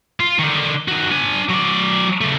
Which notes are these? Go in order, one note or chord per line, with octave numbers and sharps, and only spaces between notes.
F4
D3 D#3
D#3 F#4
D4 G#5
F#3 D5
C#3 A3